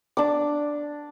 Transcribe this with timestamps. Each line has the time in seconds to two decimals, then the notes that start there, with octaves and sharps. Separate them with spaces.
0.17 D4 D6